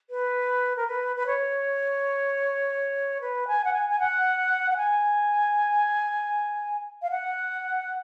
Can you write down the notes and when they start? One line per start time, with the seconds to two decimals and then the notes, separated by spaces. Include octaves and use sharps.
0.10 B4
0.76 A#4
0.87 B4
1.16 B4
1.26 C#5
3.21 B4
3.47 G#5
3.64 F#5
3.73 G#5
3.89 G#5
3.99 F#5
4.71 F#5
4.77 G#5
7.02 F5
7.11 F#5